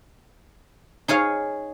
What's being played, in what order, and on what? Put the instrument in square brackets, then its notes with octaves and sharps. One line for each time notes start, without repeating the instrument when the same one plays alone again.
[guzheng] D#4 G#4 C#5 F5